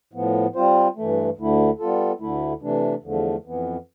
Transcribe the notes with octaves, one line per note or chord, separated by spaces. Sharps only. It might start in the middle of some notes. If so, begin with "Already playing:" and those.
A2 F3 B3
G3 C4 F4 C5
G2 E3 A3
D2 D3 A3 E4
G3 B3 F4 A4
D2 D3 A3 E4
C3 E3 A3 D4
E2 D3 F3 A3
F2 E3 B3